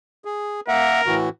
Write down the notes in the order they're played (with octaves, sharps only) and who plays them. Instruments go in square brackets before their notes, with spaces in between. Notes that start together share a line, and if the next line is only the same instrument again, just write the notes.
[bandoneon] G#4
[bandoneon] A#3 E5 F#5 [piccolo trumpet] A#4
[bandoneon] A2 E3 F#4